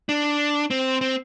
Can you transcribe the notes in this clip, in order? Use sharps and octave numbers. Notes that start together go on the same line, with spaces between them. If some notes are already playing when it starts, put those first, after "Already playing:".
D4
C4
C4